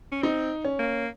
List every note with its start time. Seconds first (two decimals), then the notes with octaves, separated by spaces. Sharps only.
0.12 C#4
0.22 C4 D#4
0.65 C#4
0.79 A#3